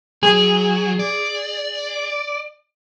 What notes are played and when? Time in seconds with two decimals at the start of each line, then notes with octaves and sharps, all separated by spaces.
0.23 F#3 G#4
0.99 D5